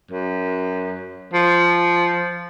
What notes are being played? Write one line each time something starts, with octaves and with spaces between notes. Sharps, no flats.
F#2
F3